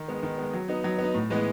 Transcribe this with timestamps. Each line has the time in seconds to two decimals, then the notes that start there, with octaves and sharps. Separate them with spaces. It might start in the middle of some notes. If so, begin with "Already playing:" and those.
Already playing: D#3
0.08 G#3 B3
0.23 D#3
0.38 G#3 B3
0.54 F#3
0.68 B3 D#4
0.84 F#3
0.99 B3
1.04 D#4
1.14 A2
1.30 E3 G#3 B3